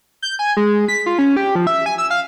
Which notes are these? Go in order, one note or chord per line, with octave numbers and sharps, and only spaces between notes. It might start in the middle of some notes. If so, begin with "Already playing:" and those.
G6
G#5
G#3
B6
F4
C#4
G4
F3
E5
G#5
E6
F5